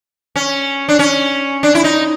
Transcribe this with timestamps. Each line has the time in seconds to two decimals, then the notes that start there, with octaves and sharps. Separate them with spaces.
0.36 C#4
0.89 D4
0.99 C#4
1.63 D4
1.75 E4
1.84 D#4